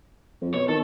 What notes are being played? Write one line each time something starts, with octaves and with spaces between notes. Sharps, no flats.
F2
B2 C#5
D#3 A4